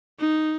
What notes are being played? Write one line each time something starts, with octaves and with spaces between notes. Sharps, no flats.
D#4